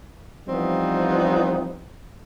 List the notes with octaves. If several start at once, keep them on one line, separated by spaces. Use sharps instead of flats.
E3 F3 G3 B3 C4 D#4